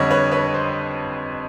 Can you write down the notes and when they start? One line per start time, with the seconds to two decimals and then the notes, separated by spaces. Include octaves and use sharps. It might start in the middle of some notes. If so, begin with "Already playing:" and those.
Already playing: F2 D3 G3 C#5 D#5
0.11 B4 C#5
0.32 B4 C#5
0.54 C5